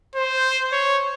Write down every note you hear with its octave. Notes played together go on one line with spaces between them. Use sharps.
C5
C#5